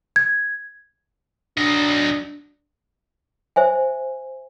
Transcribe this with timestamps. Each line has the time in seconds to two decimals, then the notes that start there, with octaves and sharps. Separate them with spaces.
0.16 G#6
1.57 F#3 D4 D#5
3.56 C5 E5 G#5